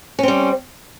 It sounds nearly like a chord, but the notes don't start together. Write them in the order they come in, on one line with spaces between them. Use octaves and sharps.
C#4 C4 G3